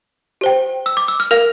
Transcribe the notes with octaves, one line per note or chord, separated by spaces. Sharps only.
G4 C5 G5
E6
D6
E6
F6
A#4 F5 F6